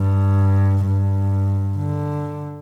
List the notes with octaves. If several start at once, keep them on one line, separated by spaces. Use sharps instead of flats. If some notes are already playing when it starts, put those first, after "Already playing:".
Already playing: G2
G2
D3